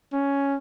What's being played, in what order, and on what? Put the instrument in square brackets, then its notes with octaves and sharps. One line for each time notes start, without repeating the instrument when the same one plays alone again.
[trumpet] C#4